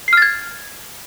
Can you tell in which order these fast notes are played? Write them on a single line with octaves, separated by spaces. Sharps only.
C7 F6 A6 G#6